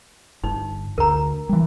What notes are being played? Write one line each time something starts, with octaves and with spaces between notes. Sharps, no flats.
G1 D#4
D2 A#4 A#5
E3 G3